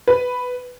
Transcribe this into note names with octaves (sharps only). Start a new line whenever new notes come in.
B4